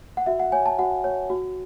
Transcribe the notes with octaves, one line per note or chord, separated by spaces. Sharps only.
F#5
F#4 E5
F#5
C#5 G#5
A5
F#4 F#5
C#5
F#4